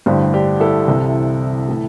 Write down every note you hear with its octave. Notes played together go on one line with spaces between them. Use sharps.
A1 G2 D3 G4 C5
D4 G4
E4 A4
C2 C3 E3
A2 E3